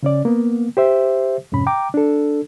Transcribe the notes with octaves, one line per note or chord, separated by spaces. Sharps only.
C#3 C#4 D5
A#3 B3
G4 C5 E5
F2 G#2 C3 C#4 B5
G5 A#5 D6
D4 A4